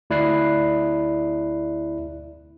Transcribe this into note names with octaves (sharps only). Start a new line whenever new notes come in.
D2 E4 D5 F#6 C7